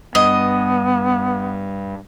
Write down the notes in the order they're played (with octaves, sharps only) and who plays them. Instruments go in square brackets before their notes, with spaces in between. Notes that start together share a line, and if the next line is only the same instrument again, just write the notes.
[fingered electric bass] G2 [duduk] B3 [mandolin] D#5